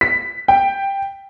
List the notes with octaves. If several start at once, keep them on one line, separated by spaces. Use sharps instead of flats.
B6
G5